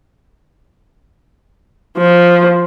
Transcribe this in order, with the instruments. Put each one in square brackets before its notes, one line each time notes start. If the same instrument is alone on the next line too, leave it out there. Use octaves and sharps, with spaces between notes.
[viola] F3